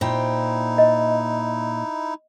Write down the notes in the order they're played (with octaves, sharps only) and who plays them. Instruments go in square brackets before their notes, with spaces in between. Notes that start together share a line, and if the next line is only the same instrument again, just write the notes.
[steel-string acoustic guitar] A#2 C5 G5 [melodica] D#4 E4
[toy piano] D#5